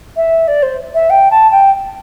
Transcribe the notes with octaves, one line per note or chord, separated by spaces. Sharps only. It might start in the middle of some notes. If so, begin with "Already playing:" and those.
E5
D5
C5
E5
G5
A5
G5